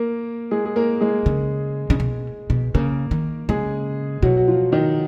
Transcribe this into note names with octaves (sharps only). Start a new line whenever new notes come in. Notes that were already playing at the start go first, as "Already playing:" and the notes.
Already playing: A#3 A#4
G#3 G#4
G#4
A#3 A#4
G#3 G#4
C#3
C#3
B2
B2
C#3 A#3 A#4
D#3
C#3 G#3 G#4
B2 F#3 F#4
F#4
F3 F4
D#3 D#4